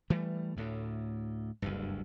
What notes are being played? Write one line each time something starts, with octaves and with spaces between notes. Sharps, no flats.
E3 G3 A3
D2 A2
F#1 D2 G2